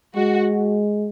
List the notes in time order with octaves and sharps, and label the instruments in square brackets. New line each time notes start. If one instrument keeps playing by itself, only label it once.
[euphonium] G#3 [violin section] F#4